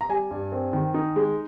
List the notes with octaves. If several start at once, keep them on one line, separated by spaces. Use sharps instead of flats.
A#5
G3 G#5
G2
C4
D#3
D#4
G#3